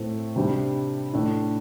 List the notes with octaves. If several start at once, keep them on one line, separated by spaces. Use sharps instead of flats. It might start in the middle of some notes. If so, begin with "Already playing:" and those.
Already playing: A2 A3 C4
C3 G3 D4
A2 A3 D4